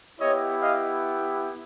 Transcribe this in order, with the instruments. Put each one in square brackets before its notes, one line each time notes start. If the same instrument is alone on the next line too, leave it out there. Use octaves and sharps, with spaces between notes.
[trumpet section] B3 E4 G4 C#5 D#5
D#5 F5